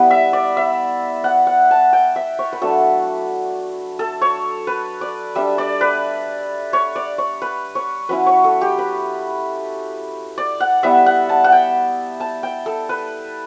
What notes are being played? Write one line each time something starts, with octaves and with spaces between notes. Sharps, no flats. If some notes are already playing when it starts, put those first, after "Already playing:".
Already playing: G3 B3 E4
E5
D5
E5
F#5
F#5
A5
G5
E5
C#5
B4
F#3 A3 D4 A4
A4
C#5
B4
D5
G3 D4 E5
D5
B4
C#5
D5
C#5
B4
C#5
F#3 C#4 E4 B4
C#5
A4
G4
B4
D5
F#5
G3 B3 E4 E5
F#5
A5
F#5
G5
A5
G5
A4
B4